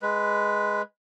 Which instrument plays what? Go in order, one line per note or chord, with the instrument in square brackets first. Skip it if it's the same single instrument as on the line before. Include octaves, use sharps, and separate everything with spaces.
[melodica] G#3 B4